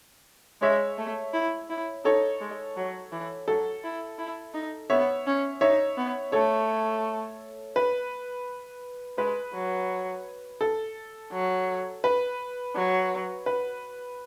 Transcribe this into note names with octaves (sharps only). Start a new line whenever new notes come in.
G#3 C#5 E5
A3
E4
E4
D#4 A4 C#5
G#3
F#3
E3
F#3 A4
E4
E4
D#4
B3 C#5 E5
C#4
D#4 C#5 E5
B3
A3 A4 C#5
B4
G#3 B4
F#3
A4
F#3
B4
F#3
B4